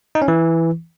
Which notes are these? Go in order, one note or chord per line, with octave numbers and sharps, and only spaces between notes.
D#4
C#4
E3